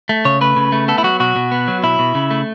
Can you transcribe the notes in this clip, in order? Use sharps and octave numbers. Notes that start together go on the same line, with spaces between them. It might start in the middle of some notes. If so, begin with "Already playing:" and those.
A3
C#3 C#5
A3 B4
C#3
A3
B3 A4
E4
F#3 F#4
B2 F#4
B2
B3
F#3
B2 E4
B2
C#3
A3